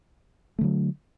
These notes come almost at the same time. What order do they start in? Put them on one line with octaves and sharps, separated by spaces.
A3 D3 F#3